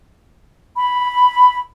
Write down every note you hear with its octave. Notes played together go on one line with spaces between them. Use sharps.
B5